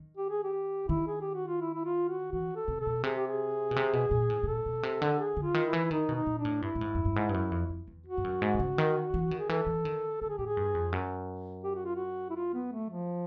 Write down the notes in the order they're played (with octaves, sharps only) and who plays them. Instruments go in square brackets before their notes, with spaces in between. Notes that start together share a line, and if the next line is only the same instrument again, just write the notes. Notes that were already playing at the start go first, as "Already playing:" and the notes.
Already playing: [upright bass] D#3
[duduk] G4
G#4
G4
[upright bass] D#3 [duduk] E4
[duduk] G#4
G4
F#4
F4
E4
E4
F4
F#4
[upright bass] E3 [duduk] F#4
[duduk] A4
[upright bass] C3
[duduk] A4
[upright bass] B2
[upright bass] C3 [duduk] G#4
[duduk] G4
G#4
[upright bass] B2
C3
B2
A#2
A2
A2
[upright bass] A#2 [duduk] A4
[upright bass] B2
C3
D3
[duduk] G#4
[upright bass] D3
[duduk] F4
[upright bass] D#3
[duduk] E4
[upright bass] E3
[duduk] E4
[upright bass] D#3 [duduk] D#4
[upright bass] B2
[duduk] D#4
[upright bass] A#2
[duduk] D4
[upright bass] A2
[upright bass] G2 [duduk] E4
[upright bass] A2
G#2
F#2
G2
G#2
G2
F#2
F2
F2
E2
[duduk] F#4
[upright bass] G2
F#2
G#2
C3
C#3
D#3
E3
D#3
[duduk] G#4
[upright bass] E3 [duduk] A4
[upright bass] E3
D#3
[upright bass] D3 [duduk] A4
[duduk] G#4
[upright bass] A2 [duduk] G4
[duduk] G#4
[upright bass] G2
F2
F#2
[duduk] G4
F#4
F4
F#4
E4
F4
B3
A3
F3